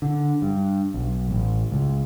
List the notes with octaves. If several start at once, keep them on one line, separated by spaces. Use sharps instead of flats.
D3
G2
B1
A1
C#2